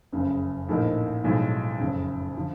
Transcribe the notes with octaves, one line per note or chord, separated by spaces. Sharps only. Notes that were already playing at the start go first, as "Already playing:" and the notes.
F#1 F2 C#3
A#1 A2 F3 A#3 D#4
B1 A2 F3 G#3
F#1 F2 C#3
D3 F3